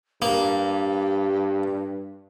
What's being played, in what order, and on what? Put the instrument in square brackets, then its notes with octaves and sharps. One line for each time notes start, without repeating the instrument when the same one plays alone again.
[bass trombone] G2 [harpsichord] A#3 [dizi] G4